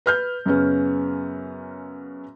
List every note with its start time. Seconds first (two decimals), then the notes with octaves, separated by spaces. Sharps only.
0.06 B4 F6 G6
0.46 F#2 C#3 B3 C#4